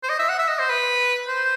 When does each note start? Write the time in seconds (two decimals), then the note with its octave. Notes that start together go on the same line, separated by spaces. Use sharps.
0.03 C5
0.09 D#5
0.19 E5
0.29 F#5
0.39 E5
0.48 D#5
0.59 C5
0.69 B4
1.28 C5